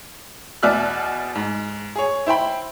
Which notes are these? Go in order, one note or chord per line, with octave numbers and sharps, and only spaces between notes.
E2 B2 D5 E5 F6 F#6
G#2
G#4 C#5
E4 C5 G5 B5